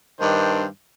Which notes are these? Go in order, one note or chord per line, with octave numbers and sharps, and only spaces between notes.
G2 D#3 D4 C5